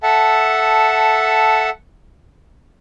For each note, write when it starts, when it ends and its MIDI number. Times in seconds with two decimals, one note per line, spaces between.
0.03 1.70 69
0.03 1.70 76
0.03 1.70 78
0.03 1.70 81